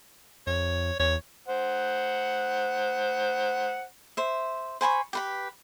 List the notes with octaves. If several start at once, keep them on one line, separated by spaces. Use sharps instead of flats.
F2 C#5
E2 C#5
C5 F#5
C5 E5
C5 G#5 B5 C#6
G4 B4 B5